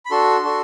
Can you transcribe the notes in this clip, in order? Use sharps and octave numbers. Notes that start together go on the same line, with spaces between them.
B5
D4 F#4 A4 C6
D4 F#4 A4